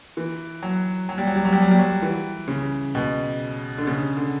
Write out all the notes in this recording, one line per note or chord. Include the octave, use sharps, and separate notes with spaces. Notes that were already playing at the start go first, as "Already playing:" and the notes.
E3
F#3
F#3
G3
F#3
G3
F#3
G3
F#3
G3
F#3
E3
C#3
B2
D3
C#3
D3